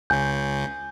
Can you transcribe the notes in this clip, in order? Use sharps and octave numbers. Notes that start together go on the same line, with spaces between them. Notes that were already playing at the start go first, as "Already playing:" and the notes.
C#2 C#3 G#5 G6